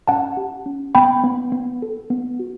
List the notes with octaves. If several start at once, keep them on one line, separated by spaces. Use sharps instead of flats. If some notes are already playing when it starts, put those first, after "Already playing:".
C#4 F#5 A5
G4
C#4
B3 G5 B5
B3
B3
A4
B3
F#4